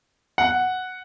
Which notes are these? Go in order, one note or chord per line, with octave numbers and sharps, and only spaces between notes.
F#5